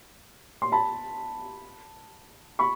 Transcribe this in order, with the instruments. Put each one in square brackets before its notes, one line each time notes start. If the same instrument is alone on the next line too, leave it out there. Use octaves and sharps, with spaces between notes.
[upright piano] C6
A5 B5
B5 C#6